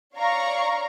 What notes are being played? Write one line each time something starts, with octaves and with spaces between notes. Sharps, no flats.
C#5 D5 F5 A#5 C#6